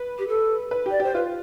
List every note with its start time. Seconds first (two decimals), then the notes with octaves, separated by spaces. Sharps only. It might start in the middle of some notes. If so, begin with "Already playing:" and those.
Already playing: B4
0.18 G4
0.28 A4
0.71 B4
0.86 G4 D5
1.00 G4 C5
1.14 F4 B4